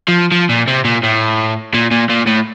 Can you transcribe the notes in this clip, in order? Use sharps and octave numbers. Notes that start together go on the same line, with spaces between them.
F3
F3
A#2
C3
A#2
A2
A#2
A#2
A#2
A2